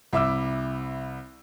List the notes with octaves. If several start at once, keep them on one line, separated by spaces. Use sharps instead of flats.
C2 E5 D6 E6